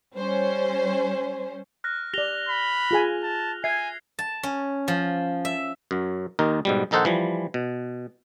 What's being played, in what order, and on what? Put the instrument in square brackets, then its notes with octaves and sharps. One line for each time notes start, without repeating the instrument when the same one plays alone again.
[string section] G3 C#4 C5
[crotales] F6 F#6 A#6
[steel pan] G4 D5 [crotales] A#6 F7 G7
[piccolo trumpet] B5
[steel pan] F4 G#4 G#5
[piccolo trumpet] A5
[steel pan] E5 [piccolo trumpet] G#5 [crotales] G#6 C7
[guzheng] A5
C#4
F3
E5
[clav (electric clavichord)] F#2 F#3
D#2 D#3 D#4 A#4
G#2 B2 G3
A#1 D#3 D#4 A4 C5 F#5
E3 F3 G3
B2